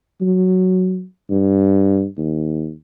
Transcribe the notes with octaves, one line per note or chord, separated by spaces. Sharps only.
F#3
G2
D#2